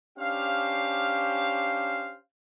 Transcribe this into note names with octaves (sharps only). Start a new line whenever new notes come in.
C#4 D4 G4 C5 F5